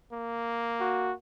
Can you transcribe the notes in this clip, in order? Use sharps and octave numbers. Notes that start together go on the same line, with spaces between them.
A#3
F#4